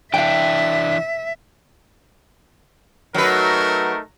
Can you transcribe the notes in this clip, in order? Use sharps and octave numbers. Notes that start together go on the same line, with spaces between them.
E3 D4 E5 F5 G5
F#3 A3 D#4 A#4 B4